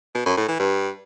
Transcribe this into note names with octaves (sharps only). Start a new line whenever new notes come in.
B2
F#2
A2
E3
G2